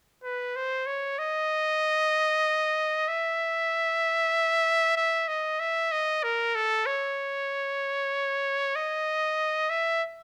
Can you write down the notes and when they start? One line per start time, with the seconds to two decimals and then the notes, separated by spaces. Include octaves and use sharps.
0.24 B4
0.56 C5
0.87 C#5
1.19 D#5
3.08 E5
4.97 E5
5.28 D#5
5.60 E5
5.92 D#5
6.23 A#4
6.55 A4
6.86 C#5
8.75 D#5
9.70 E5